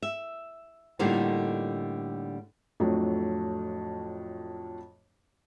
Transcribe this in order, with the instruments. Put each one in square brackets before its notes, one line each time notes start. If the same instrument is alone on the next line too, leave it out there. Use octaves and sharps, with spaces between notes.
[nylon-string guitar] E5
A2 D3 G3 A#3 D#4 F4
[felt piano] F2 A2 F#3 A3 D4